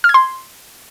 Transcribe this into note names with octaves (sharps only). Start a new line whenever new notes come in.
F6
G#6
C6